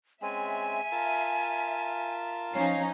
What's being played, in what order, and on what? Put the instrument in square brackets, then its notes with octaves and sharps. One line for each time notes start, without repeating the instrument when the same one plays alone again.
[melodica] G#3 C4 C#4 [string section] E5 [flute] G#5
[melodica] F4 A#4 A5
[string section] F3 C#4 D#4 [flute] F5